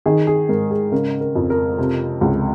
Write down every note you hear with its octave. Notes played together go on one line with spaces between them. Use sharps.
D#3 G#4
G#4
G#2 A#4
G#4
C#3 A#4
A#4
F2
A#4
C3
C#2